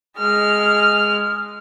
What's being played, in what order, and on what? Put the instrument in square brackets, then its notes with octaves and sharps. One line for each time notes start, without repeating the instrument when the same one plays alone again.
[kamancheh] G#3 F6